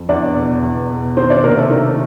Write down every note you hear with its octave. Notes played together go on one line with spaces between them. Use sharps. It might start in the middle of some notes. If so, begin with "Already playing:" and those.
Already playing: F2
E2 D4 D5
B2
E2
B2
D#3 C4 C5
D4 D5
C3 A#3 A#4
A3 A4
D#3